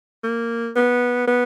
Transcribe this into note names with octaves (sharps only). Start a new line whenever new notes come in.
A#3
B3
B3